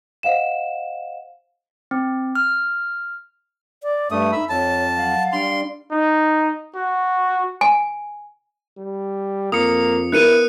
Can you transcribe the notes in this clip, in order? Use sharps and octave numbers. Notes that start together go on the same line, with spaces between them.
C5 D#5 F5 F#5 E7
C4
F6
D5
G2 A3 E5 D#6
D#4 E5 B5 E6
F2 C#5 A5
F#3 F5 F#5
G3 D4 D5 C6
D#4
F#4
G#5
G3
F2 A#3 D#6 C#7
B3 E4 A#4 F#6 C#7 D#7